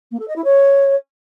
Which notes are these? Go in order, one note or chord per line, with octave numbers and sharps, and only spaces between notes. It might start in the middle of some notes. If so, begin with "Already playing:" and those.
A#3
A4
D#5
E4
C#5